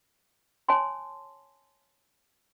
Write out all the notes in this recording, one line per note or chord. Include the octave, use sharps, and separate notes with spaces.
C#5 G#5 A5 C6